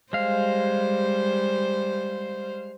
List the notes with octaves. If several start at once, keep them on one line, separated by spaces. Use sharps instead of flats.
G3 G#3 C5 F5